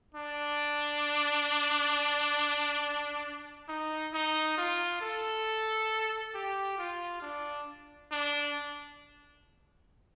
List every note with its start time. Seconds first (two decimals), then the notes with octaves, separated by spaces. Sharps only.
0.15 D4
3.68 D#4
4.13 D#4
4.58 F4
5.01 A4
6.34 G4
6.78 F4
7.22 D4
8.12 D4